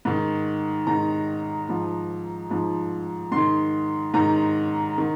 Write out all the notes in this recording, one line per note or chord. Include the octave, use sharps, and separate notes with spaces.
G#2 D#3
G#2 D#3 A#5
G#2 F3
G#2 F3
G#2 D#3 C6
G#2 D#3 A#5
D#3